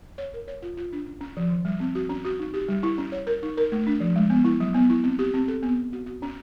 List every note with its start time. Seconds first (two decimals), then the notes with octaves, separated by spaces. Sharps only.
0.18 C#5
0.34 A#4
0.48 C#5
0.62 F4
0.77 F4
0.93 D4
1.06 C#4
1.21 C#4
1.37 F3
1.50 D#3
1.65 G3
1.80 C4
1.95 F#4
2.09 C#4
2.25 F#4
2.39 D#4
2.54 G4
2.69 G3
2.83 E4
2.98 C#4
3.12 C#5
3.27 A#4
3.43 D#4
3.57 A#4
3.72 A3
3.87 D4
4.00 F3
4.16 G#3
4.30 B3
4.45 E4
4.60 F#3
4.74 B3
4.90 E4
5.04 C4
5.19 G4
5.34 C4
5.48 A4
5.63 B3
5.77 B3
5.93 F#4
6.06 F#4
6.22 C#4